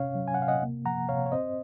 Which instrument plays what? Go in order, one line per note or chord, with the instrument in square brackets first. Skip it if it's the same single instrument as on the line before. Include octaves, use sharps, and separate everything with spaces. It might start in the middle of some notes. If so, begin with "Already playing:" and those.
Already playing: [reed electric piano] C3 C#4 C#5 F5
F#3
G#5
F#5
C3 F5
D#5 F#5
A#3
F3 F#5 A#5
C3 C#5 F5
C#5
C4 C5 D#5